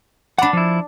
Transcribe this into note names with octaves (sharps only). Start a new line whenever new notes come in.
D4 D5 F#5 B5
F3 E4